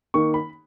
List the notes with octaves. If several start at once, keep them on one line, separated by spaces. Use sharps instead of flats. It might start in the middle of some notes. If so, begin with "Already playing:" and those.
D#3 A#3 D#4 C#6
B5